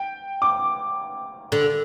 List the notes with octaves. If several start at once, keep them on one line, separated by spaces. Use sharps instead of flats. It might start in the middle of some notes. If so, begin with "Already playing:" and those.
Already playing: G5
D6
D3